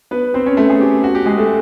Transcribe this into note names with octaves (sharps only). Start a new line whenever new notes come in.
B3 B4
C4 C5
C#4 C#5
A3 A4
G#4
G4
F#4
G4
G#3 G#4
A3 A4